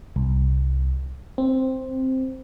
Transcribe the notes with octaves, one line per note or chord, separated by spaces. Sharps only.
C2
C4